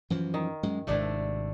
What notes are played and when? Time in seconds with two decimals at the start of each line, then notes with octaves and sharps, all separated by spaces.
0.10 F#2 E3 F3
0.34 D#3
0.63 F#2 G#3
0.87 G#1 C3 A3 D4 E4